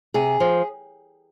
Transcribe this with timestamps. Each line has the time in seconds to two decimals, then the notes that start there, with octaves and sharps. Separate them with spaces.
0.14 C3 G#4
0.40 F3